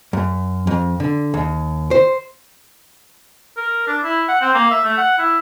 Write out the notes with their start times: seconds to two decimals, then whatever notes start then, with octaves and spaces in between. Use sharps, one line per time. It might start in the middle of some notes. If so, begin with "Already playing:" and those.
0.13 F#2
0.67 F2
1.00 D3
1.34 D#2
1.91 C5
3.57 A#4
3.87 D4
4.04 E4
4.29 F#5
4.41 C4
4.54 A#3
4.71 E5
4.84 A3
4.97 F#5
5.19 E4